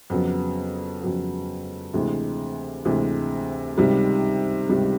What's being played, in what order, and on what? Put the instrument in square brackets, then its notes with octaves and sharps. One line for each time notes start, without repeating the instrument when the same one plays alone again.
[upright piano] F2 C#3 F#3 B3
F2 C#3 F#3 B3
D2 C3 E3 G#3
D2 C3 E3 G#3
C#2 C3 D#3 G3
C#2 C3 D#3 G3